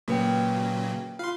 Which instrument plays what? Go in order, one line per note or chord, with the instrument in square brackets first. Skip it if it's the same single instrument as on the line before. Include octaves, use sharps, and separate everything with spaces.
[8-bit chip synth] A#2 C#3 F#3 [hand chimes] A#3 B4 G5
[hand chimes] F4 [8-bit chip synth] F5 C6